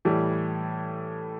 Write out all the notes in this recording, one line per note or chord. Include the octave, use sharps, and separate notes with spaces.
A2 E3 G3